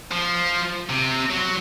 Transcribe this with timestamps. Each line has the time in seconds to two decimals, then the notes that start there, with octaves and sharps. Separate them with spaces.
0.11 F3
0.90 C3
1.30 F#3